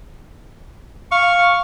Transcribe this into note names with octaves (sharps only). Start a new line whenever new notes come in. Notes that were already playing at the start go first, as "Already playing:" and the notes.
F5 C#6